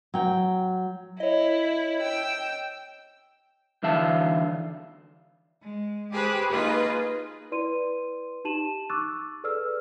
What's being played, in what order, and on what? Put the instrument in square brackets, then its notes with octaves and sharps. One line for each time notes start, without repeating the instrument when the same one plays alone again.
[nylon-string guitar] F#3 G5
[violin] E4 [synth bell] C#5 D#5
[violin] G5 E6
[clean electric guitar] D3 E3 E5 F5 A5
[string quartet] G#3
G4 G#4 B4 C5 B5 D#6
A#3 D#4 F4 G#4 B4 D#5
[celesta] E4 B4 D5 C6 D#7
D#4 G4 A5 D#7 E7 F#7
C#6 D6 E6 F#6 A6
G#4 A4 B4 D5 E6 F6